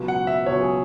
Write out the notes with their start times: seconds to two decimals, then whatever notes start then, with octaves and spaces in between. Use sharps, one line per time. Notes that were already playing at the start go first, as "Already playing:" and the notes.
Already playing: C#2 B2 F#3
0.08 F#5
0.27 E5
0.46 C#2 B2 F#3 C#5
0.61 G#4